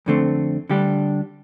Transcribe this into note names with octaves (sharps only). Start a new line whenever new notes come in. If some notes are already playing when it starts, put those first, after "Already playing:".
F2 D3 A3 C4
D2 D3 G3 D4 G4